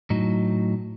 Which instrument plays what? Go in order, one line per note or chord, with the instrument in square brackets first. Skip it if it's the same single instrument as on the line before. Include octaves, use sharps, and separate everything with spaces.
[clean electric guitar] A2 F#3 D#4